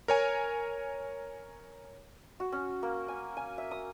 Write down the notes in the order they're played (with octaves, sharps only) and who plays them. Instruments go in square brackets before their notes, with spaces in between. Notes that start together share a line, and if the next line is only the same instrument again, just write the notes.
[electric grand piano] A#4 C#5 G#5
[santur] F#4
C#4
A#3
G#5
G#5
E5
D#6